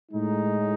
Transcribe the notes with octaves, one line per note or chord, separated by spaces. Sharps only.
A2 G#3 D#4